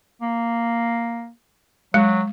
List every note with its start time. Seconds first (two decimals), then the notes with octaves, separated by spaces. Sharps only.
0.22 A#3
1.94 F#3 G#3